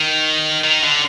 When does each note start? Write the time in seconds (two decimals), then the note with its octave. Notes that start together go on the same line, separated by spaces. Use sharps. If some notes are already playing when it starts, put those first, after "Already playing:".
Already playing: D#3
0.64 D#3
0.83 D3